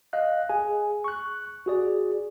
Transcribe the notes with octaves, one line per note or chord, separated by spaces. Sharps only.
D#5 F5 F#6
G#4 G#5
C#6 F#6
F#4 G#4 D5